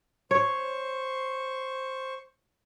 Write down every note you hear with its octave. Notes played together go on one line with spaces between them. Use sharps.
C5 C#5 C#6